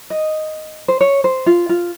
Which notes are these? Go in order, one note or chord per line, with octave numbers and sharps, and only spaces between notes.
D#5
C5
C#5
C5
F4
F4